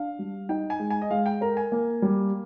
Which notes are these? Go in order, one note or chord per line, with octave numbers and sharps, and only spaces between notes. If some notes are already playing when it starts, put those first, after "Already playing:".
Already playing: D4 F5
G3
D#4 G5
G#5
G#3
G#5
D#5
G#3 F5
G5
A#4 A#5
G#5
A#3
G3